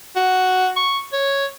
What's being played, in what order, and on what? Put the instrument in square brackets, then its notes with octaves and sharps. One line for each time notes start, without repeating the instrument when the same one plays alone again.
[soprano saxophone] F#4
C#6
C#5